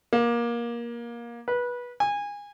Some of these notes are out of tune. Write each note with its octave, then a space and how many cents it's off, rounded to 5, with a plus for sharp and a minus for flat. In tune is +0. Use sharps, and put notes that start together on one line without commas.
A#3 +20
B4 -20
G#5 -25